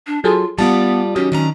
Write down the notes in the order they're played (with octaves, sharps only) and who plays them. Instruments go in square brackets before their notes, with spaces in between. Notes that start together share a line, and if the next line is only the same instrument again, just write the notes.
[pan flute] D4
[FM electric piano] F#3 G#4 A4 [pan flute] F4
[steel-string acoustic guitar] G3 F4 D5 [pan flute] B3 [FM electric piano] A5
[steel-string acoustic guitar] D#3 D#4 G4 [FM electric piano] F#3 [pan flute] C#4
[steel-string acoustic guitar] D#3 D4 A#5 [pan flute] C#4